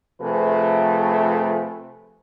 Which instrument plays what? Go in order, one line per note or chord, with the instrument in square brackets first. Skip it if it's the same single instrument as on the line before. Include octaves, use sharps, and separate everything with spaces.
[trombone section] C3 F3 A3 G#4 B4